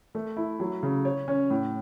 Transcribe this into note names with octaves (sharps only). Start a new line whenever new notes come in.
A3
E4
F#3
C#3
C#5
C#4
A2